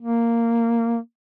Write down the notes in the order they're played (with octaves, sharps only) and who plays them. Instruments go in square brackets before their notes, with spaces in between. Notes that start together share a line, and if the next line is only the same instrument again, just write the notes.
[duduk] A#3